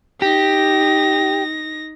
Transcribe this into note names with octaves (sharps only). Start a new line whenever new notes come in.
D#4 G4 A#6